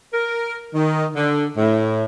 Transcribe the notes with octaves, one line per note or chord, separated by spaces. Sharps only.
A#4
D#3
D3
A2